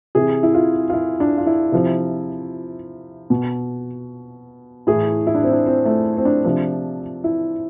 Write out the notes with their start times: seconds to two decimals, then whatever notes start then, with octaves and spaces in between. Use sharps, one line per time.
0.15 C3 E3 G#4
0.43 E4
0.54 F4
0.90 F4
0.93 E4
1.20 D4
1.38 F4
1.47 E4
1.72 C3 F3
3.30 B2
4.87 A2 E3 G#4
5.27 E4
5.35 D4
5.44 C4
5.52 D4
5.66 C4
5.85 A3
6.17 C4
6.25 D4
6.45 C3 F3 D4
7.24 E4